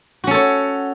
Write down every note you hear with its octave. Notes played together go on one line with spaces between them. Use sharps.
C#4 F#4 A4 C#5